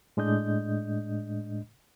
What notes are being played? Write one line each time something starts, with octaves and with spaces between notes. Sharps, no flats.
A2 G#3 D4 D#5 G6